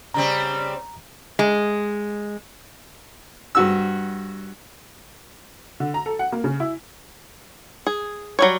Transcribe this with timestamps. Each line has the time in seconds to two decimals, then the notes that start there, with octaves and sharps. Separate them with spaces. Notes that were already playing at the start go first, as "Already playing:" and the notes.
0.14 C#3 G3 C4 A#5
1.39 G#3
3.55 G2 F#4 E6
5.80 D3
5.94 A#5
6.06 A4
6.19 F#5
6.32 A#3
6.44 C#3
6.60 E4
7.87 G#4
8.39 F#3 G3 C#5